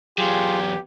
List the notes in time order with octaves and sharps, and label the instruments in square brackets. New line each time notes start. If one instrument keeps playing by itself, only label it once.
[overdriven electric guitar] E2 F#3 [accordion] F4 G#4 [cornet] G4